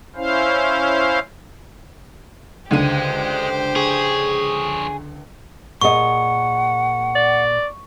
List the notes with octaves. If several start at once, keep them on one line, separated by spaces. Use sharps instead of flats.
C#4 E4 C5 F5
C#2 D3 G#3 G4 C5 D#7
F3 G#4 C#5
A#2 G#4 D#5 F#5 C#6
D5